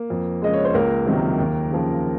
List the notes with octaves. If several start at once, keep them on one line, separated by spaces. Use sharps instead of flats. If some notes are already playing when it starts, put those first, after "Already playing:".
Already playing: A#3
F2
C#3 G#3 D#5
C#5
C5
C#2 A#3 A#4
C3 D#3 F#3
D#2
C#3 F3